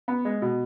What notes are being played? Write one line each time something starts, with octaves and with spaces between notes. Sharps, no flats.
B3
G#3
B2